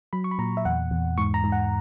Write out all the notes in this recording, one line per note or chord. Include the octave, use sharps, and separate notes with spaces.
F#3 B5
C#6
B5
A#2 A#5
E5
E2 F#5
E2
G#2 C#6
A#5
G#2
F#5